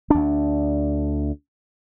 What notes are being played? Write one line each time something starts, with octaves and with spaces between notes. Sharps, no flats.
D2 D4